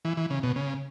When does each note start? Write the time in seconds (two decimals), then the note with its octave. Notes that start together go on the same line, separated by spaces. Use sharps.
0.05 E3
0.17 E3
0.30 C#3
0.43 B2
0.56 C#3